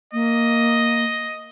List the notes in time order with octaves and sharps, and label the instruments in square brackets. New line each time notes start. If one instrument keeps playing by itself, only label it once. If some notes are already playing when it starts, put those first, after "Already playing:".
[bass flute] A#3 [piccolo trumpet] D#5